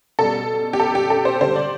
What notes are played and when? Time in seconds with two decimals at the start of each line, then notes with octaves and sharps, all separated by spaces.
0.19 B2 G3 A4
0.73 G4
0.80 A4
0.95 G4
1.10 A4
1.25 C5
1.41 D3 G3 C5
1.56 D5